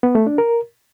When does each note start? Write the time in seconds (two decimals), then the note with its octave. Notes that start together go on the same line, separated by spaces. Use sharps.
0.03 B3
0.15 A3
0.27 D4
0.38 A#4